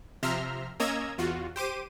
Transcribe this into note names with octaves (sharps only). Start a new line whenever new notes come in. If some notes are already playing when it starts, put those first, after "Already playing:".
C3 F3 E5 A#5 C6 F6
A#3 C#4 D#5 A#5 E6 G#6
E2 F4 F#4
G4 C5 D6 D#7